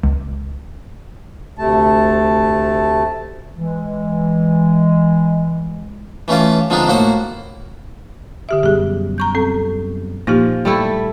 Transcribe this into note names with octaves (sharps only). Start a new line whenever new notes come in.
C#2
D2 C3 A3 A5
E3 G#3
E3 A3 C#4 F4 D5
D3 F3 G#3 C4 D4 D#4
A2 A#3 F#4 C5 F#5
D3 G4 E5
F#2 B2 G3 G4 G#4
A#5 C#6 G6
C4 A4
A#2 F3 A#3 D#4 G4
G3 A3 E4